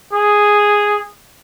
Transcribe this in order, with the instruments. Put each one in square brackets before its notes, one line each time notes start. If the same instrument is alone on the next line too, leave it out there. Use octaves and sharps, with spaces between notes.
[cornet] G#4